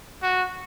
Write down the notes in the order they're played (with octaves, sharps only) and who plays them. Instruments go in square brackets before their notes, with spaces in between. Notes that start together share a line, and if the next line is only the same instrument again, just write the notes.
[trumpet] F#4